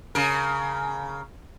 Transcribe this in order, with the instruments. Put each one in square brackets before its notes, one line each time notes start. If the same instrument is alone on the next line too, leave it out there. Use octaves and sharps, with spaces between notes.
[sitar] C#3 A#4